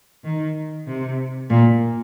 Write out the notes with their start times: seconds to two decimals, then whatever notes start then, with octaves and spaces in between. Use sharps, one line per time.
0.24 D#3
0.87 C3
1.50 A#2